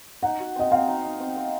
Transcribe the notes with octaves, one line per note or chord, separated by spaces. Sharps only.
D#4 F#5
F#4
C4 D#5
C4 F5
D#4
D#4
C4
C4